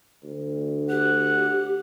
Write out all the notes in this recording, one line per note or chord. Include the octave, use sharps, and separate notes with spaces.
D2
G4 F#5